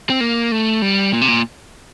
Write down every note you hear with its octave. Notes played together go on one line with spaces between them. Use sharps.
C4
A#3
A3
G3
A#2
C3
A#2